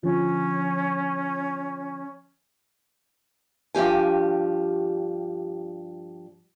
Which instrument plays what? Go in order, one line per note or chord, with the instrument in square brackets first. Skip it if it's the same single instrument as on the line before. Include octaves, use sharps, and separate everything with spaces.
[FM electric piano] D3 F3 [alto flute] C#4
[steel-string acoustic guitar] G2 F3 G4 G#5